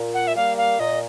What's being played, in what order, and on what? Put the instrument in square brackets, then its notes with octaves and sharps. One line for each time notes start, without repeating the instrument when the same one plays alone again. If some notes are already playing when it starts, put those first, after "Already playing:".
Already playing: [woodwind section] A#2
[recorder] F#5
E5
[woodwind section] G3 A#3 [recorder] F5
[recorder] F5
[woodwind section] A#2 [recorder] D#5